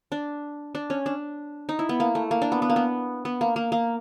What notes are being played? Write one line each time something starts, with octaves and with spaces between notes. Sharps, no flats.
D4
D4
C#4
D4
D#4
E4
B3
A#3
A3
A#3
D4
B3
B3
A#3
B3
B3
A#3
A#3
A#3